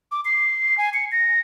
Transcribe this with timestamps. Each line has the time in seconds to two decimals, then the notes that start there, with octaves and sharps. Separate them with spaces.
0.12 D6
0.25 C7
0.78 G#5
0.94 C#7
1.12 A#6